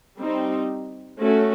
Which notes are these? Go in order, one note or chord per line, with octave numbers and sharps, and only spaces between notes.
G3 C4 D#4
A3 C#4 F#4